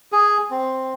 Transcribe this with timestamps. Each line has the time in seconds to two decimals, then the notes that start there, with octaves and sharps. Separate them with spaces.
0.12 G#4
0.51 C4